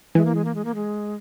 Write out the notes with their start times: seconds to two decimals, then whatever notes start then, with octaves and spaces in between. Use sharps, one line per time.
0.15 E3 G#3
0.25 A#3
0.35 G#3
0.44 A#3
0.55 G#3
0.64 A#3
0.74 G#3